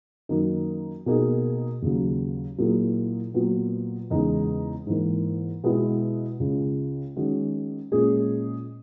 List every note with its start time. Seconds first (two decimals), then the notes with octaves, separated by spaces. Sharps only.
0.29 F#2 D#3 A#3 D#4
1.06 B2 A#3 D#4 G#4
1.82 D#2 C#3 F#3
2.58 A#2 F#3 A#3 E4 G#4
3.34 A#2 F#3 B3 F#4
4.10 E2 C#3 G#3 B3 D#4
4.87 G#2 E3 A#3
5.63 B2 G#3 B3 E4
6.39 C#2 C#3 G#3
7.16 D#3 G#3 C#4 F#4
7.92 A#2 G#3 C#4 G#4